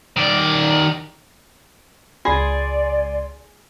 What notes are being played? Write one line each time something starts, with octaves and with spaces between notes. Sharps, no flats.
D#3 D5
C#2 F4 G#4 D5 G#5 C6